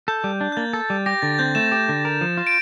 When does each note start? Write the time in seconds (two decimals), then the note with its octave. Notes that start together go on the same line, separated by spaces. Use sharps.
0.08 A4 G6
0.24 G3
0.41 D4
0.52 G6
0.57 A#3 A6
0.73 A4
0.90 G3
1.06 G4 A#6
1.22 D3 A6
1.34 A6
1.38 C4 G6
1.55 A3 E7
1.72 G4
1.89 D3
2.05 A#4
2.21 F3
2.37 F4
2.47 D7